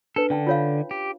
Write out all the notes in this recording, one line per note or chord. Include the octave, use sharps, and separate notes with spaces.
D4 A4 B4
D3 C#4 G5 A5
F4 C#5 F5
G4